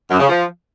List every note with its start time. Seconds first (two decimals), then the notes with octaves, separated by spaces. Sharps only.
0.11 F#2
0.20 C#3
0.29 F3